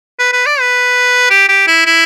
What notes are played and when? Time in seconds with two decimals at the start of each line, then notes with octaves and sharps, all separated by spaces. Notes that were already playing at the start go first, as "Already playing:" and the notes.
0.19 B4
0.33 B4
0.46 D5
0.60 B4
1.30 G4
1.48 G4
1.67 E4
1.86 E4